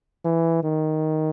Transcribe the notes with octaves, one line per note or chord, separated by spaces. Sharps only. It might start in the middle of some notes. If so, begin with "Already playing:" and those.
E3
D#3